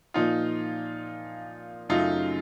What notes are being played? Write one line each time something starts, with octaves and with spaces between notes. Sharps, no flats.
A#2 F3 A#3 D#4 F4
F#2 C#3 F#3 A3 D#4 F4